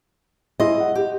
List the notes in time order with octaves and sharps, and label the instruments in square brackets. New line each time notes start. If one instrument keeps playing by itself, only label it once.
[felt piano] E4 G#4 C6 [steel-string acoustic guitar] D#5
[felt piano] F#5
[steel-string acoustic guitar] G4